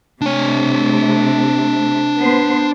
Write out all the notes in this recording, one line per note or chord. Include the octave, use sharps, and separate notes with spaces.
C3 A3 D4 C#5
B3 C5